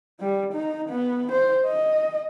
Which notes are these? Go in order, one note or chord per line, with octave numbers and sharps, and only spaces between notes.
G3
D#4
B3
C5
D#5